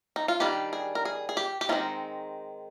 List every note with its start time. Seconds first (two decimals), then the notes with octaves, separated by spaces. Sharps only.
0.16 D#4
0.28 F4
0.40 D#3 G3 D4 G4
0.73 G#4
0.95 A#4
1.05 G#4
1.29 G#4
1.37 G4
1.61 G4
1.69 D#3 G#3 C4 D#4 F4